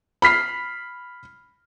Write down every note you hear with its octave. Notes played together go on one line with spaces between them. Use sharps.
B5 F6 B6 C7